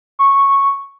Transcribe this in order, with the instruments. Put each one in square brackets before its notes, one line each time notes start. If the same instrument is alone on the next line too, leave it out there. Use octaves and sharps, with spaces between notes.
[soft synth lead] C#6